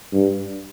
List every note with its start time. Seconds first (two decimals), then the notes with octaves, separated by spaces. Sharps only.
0.13 G2